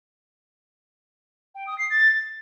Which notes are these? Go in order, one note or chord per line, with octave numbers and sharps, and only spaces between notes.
G5
D#6
C7
A6